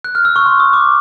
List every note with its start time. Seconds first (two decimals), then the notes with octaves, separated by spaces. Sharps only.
0.04 F#6
0.15 F6
0.25 E6
0.36 C#6
0.46 C6
0.60 D#6
0.73 D6